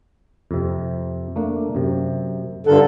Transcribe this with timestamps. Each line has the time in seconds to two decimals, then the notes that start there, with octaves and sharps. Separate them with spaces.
0.51 F2 C3
1.36 A3 A#3 D4
1.75 F#2 C3
2.67 G2 D3 F4 A4 A#4 F#5